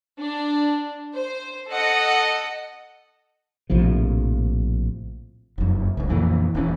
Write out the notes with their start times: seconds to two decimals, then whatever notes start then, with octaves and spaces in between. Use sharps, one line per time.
0.20 D4
1.15 C5
1.69 A4 D#5 F#5
3.70 A#1 A2 C3 F3
5.58 F1 F#2
5.97 D1 C#2
6.10 F2 A#2 E3
6.55 D#1 E3 C#4